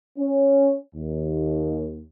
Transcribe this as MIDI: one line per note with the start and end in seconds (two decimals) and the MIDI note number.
0.19 0.77 61
0.95 2.05 39